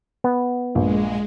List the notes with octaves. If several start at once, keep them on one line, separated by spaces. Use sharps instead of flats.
B3
A#1 G#3